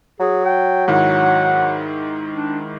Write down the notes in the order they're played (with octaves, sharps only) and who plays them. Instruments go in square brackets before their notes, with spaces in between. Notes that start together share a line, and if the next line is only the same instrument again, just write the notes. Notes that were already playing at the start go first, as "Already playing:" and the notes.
[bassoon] F#3 [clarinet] G#4
[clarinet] G5
[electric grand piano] G#2 D#3 E4 [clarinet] F#5
[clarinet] D4